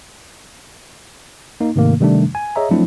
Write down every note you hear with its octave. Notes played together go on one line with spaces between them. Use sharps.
A#3 D#4
G#2 C3 D#3 A3 A#3
C3 D#3 G3 A3 D4
G#5
G#4 C#5 D#5 E5 A#5
F3 F#3 A3 C4 D4 E4